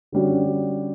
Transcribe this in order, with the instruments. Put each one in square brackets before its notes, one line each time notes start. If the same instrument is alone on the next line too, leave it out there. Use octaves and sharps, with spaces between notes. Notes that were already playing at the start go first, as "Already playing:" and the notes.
[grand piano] D3 G3 C#4 F#4